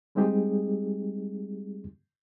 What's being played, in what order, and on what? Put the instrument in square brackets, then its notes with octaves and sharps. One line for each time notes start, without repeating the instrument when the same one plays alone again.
[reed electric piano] G3 G#3 C4 D#4 G4 G#4